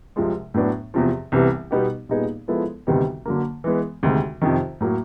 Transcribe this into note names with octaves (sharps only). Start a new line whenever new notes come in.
C2 C3 F3 G#3
A2 F#3 B3 D4
E2 C3 F3
C2 C3 E3 G3 B3
B2 G3 B3 D#4 G4
A#2 G3 B3 D#4 G#4
F3 G#3 B3 E4 A4
D2 C3 D#3 G3 B3
D3 F#3 A#3
E3 G#3 B3
D2 C3 D#3 G#3
F2 C3 D#3
A2 F#3 A#3